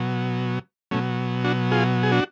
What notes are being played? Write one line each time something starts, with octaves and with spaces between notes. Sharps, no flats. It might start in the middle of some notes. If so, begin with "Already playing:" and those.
Already playing: B2 F#3
B2 F#3 A3 C#4
D4 F#4
F4 G#4
G#4
D4 F#4